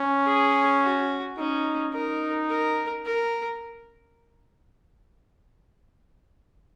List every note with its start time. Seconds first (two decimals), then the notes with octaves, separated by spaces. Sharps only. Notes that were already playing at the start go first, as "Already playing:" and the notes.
Already playing: C#4
0.26 G#4
0.83 F#4
1.38 C#4 D#4
1.93 D#4 A#4
2.50 A#4
3.05 A#4